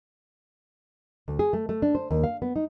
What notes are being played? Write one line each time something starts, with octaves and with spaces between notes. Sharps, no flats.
D2
G#4
A3
A3
D4
C5
D#2
F5
B3
D#4